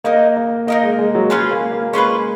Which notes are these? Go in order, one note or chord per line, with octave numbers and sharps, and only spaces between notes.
A#3 D#4 A#4 D#5
A#3
A#3 D#4 A#4 D#5
G#3
G#3
F#3
G#3 C#4 F4 G#4 B4
A#3
A#3
G#3 C#4 F4 G#4 B4